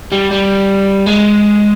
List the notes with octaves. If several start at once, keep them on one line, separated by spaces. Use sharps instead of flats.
G3
G3
G#3